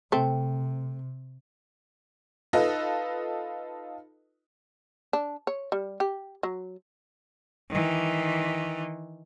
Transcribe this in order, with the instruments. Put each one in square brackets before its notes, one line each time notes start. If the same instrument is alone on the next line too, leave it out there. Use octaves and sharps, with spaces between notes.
[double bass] C3 [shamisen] A3 C4
[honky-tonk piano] D#4 F4 A4 B4 D#5
[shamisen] D4
C#5
G3
G4
F#3
[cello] D#3 E3